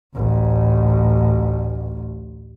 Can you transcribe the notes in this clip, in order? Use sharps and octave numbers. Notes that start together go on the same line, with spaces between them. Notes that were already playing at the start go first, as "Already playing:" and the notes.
A1 D2